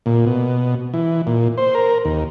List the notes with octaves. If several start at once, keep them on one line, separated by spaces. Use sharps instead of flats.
A#2
B2
E3
A#2
C5
A#4
D#2